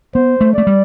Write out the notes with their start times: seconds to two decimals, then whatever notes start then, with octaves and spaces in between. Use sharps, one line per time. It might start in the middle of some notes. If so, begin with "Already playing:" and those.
0.14 B3 C5
0.41 A3
0.54 A3 D5
0.67 G3